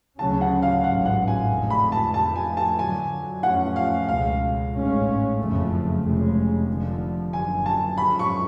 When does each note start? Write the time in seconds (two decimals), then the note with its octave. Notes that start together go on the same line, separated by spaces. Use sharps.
0.19 D2 C#3 F#3 C#4 A5
0.41 F#5
0.62 F5
0.84 A1 G#2 F#3 F#5
1.06 F#5
1.28 G#5
1.49 F1 F2 D3 G#3
1.70 B5
1.92 A5
2.14 F2 F3 A3 A5
2.36 G#5
2.57 A5
2.79 F#2 D3 F#3 G#5
3.43 F2 F3 A3 C#4 F#5
3.76 F5
4.08 C#2 B2 G#3 F5
4.73 A1 G#2 G#3 C#4
5.38 F#1 F2 C#3 F3 A3
6.03 F1 F2 C#3 G#3
6.68 F1 F2 D3 F3
7.33 F#1 F#2 D3 G#5
7.66 A5
7.98 F#2 F3 G#3 C#4 B5
8.19 C#6